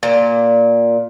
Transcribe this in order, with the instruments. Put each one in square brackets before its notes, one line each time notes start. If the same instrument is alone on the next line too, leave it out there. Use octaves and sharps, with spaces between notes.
[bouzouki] A#2